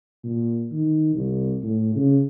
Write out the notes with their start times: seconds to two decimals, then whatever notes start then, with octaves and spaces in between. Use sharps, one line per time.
0.24 A#2
0.72 D#3
1.14 C2
1.63 A2
1.96 C#3